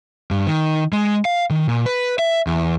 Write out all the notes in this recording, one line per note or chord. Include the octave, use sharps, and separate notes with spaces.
G2
D#3
G#3
F5
D#3
A#2
B4
E5
E2